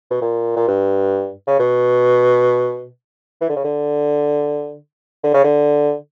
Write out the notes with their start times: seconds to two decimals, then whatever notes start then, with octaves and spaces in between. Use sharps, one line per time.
0.11 B2
0.22 A#2
0.56 A#2
0.68 G2
1.47 C#3
1.59 B2
3.41 E3
3.49 D3
3.56 C#3
3.64 D3
5.23 D3
5.33 C#3
5.44 D3